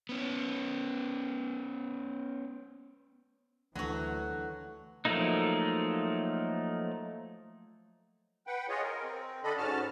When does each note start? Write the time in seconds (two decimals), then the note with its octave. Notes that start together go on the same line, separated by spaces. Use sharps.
0.09 B3 C#4
3.75 D2 D3 E3 F#3 A3 F#4
5.05 F3 F#3 A3 A#3 D#4
8.47 B4 F#5 G5
8.69 F4 G#4 C#5 D#5
8.82 A#4
9.04 C4
9.44 D3 D4 A4 D#5 B5
9.58 G#2 C#4 F#4 A5 F6